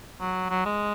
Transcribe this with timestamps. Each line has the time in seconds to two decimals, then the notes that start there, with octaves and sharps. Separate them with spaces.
0.20 F#3
0.50 F#3
0.65 G#3